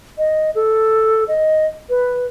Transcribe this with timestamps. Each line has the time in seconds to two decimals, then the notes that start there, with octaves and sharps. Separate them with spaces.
0.18 D#5
0.55 A4
1.28 D#5
1.89 B4